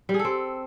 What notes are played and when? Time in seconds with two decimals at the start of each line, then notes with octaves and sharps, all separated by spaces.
0.09 G3
0.14 G#4
0.19 A4
0.25 C4